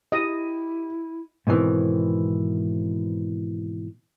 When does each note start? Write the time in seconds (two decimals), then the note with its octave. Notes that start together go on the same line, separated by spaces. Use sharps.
0.12 E4 G4 D#5 D#7
1.47 G#2 B2 D#3 E3 C4